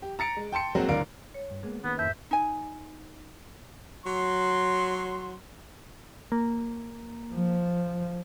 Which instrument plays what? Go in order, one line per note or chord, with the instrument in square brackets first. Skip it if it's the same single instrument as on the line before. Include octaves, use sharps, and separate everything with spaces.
[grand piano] G4
A#5 A6 C#7 D7
G#3
G5 A5 C6 C#7
F#3 G#3 A#3 C4 F#4
F#1 D2 A#4 D5 F5 D7
[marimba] C#5
[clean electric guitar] G2
[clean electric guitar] G#3 A#3 B3 [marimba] G#4
[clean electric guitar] D#3 A#3 C#4 [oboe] B3 [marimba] B4
[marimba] F2 G#2 [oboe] E5 [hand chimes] G6
[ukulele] D#4 G#5
[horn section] F#3 C6
[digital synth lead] A#3
[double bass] F3